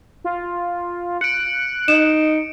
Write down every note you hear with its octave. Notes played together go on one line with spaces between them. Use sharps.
F4
F#6 C#7 D7
D#4 E7